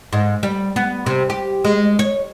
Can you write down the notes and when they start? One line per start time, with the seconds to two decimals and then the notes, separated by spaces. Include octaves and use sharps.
0.13 G#2
0.43 G3
0.76 B3
1.06 C3
1.30 G4
1.64 G#3
1.99 C#5